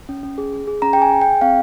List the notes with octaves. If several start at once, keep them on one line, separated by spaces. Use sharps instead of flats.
C#4
C#4
G#4
G#4
G#4
C#4 A#5
G5
G#4 G#5
G#4
G5
G#4
C4 F5